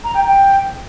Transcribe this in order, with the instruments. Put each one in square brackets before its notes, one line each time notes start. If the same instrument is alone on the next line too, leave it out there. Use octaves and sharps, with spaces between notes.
[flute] A#5
G5
G5